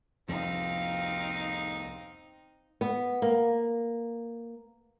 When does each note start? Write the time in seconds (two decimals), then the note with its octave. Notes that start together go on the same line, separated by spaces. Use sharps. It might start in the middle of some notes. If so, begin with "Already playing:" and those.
0.29 C2 F2 F3 C4 D#4 F5
2.81 B3
3.22 A#3